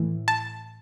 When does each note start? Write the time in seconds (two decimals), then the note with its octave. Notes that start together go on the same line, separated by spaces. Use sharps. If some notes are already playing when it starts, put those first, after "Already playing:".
Already playing: A2 E3
0.28 A5